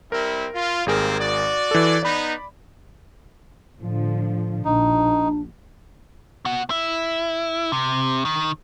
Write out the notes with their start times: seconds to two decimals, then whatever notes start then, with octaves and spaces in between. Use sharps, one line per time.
0.12 G3 C4 E4 A#4
0.55 F4
0.86 G#1 G3 A#3 C4 G#4 A#4
1.20 F#4 D5
1.71 E3 A4
2.03 B3 D#4 D5 B5
3.78 A2 D3 F3
4.65 A#1 D4 D#4
6.45 B2 F#5
6.70 E4
7.72 C3
8.25 D#3